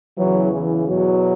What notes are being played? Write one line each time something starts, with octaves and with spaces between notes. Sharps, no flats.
E2 C#3 E3 F#3
E3
E2 B2 F#3